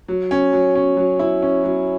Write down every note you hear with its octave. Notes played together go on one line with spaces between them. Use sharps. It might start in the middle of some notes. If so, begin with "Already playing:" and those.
F#3
C#4
F#3
C#4
F#3
E4
C#4
F#3